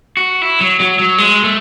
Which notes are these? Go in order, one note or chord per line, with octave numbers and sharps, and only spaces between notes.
F#4
E4
F#3
F#3
F#3
G#3
A3